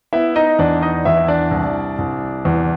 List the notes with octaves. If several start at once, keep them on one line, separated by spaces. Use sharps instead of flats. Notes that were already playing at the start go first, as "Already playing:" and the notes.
B3 E4 E5
D#4 D#5
E2 D4 D5
D#4 D#5
E2 E4 E5
D4 D5
C2
C2
E2